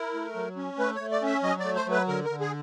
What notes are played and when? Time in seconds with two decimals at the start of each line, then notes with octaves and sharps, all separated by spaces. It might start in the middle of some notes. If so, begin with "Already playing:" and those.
Already playing: E4 A#4
0.14 A3
0.35 F#3
0.56 C#4
0.78 A3 B4
0.95 A3 C#5
1.11 D5
1.22 C#4 E5
1.43 F#3 D#5
1.60 A3 D5
1.76 C5
1.86 F#3 B4
2.08 D3 A#4
2.24 A#4
2.30 D3
2.41 G#4